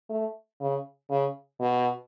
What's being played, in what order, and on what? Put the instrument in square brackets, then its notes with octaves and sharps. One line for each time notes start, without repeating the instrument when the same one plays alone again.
[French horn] A3
C#3
C#3
B2